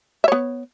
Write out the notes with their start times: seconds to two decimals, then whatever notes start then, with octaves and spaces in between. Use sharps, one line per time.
0.24 E5
0.28 C#5
0.32 B3